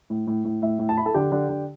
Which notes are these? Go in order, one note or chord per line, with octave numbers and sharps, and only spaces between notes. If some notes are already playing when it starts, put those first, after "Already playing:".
A2
A2
A2
A2 E5
A2
A5
E4 B5
A4 A5
D3 G4 G5
D3
D3